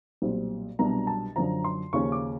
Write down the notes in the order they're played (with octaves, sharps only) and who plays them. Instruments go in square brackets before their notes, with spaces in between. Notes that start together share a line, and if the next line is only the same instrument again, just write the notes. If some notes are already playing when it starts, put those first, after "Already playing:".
[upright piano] B1 A#2 G3 C4
C2 B2 F#3 B3 D4 A#5
A5
F#2 D3 F3 A#5
C6
D#2 C#3 F3 A#3 C#4 C#6
D6